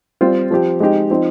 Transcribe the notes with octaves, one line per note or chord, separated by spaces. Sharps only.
G3 C4 F4
F3 C4 G4
G#3 C4 D#4 G4
F3 C4 D#4